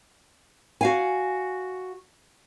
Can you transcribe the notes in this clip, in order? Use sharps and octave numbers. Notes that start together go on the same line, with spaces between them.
F#4 F5 G#5